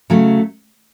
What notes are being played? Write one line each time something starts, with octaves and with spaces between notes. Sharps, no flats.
C#3 F#3 A3